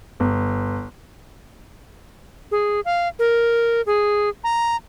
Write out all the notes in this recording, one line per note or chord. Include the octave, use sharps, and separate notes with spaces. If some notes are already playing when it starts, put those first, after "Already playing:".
G1
G#4
F5
A#4
G#4
A#5